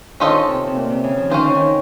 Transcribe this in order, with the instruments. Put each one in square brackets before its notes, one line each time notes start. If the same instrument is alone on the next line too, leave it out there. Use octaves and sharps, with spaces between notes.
[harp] D#3 [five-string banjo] C#4 F4 A4 C5 D#5
[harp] C3
C3
A#2
C3
C#3
F3
[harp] D#3 [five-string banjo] C#4 F4 C5
[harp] C#3
D#3